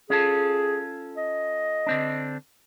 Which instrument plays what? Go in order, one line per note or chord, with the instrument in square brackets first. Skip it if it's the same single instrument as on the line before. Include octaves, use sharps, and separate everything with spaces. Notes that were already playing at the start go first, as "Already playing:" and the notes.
[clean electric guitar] C#4 F4 A4 [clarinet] G#4
[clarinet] D#5
[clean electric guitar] D3 C4 D4